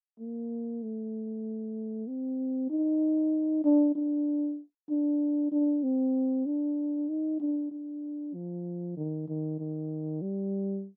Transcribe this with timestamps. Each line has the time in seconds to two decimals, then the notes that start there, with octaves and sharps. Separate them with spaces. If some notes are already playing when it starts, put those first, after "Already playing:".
0.20 A#3
0.83 A3
2.08 C4
2.70 D#4
3.64 D4
3.95 D4
4.90 D4
5.52 D4
5.83 C4
6.46 D4
7.09 D#4
7.40 D4
7.71 D4
8.34 F3
8.97 D#3
9.28 D#3
9.59 D#3
10.22 G3